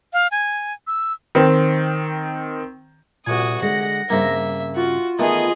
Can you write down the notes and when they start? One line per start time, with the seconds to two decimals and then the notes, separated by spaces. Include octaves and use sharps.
0.13 F5
0.31 G#5
0.87 E6
1.35 D#3 C4
3.26 C2 A#2 F#4 G#5 D#6
3.62 D3 G#3 F#5 A#6
4.10 G2 C#3 A#3 C4 E5
4.76 F4 F#4
5.19 D#3 E3 A3 B3 G#4 D#5